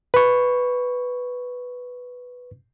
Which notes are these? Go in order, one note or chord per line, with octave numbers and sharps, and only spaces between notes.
B4 C#6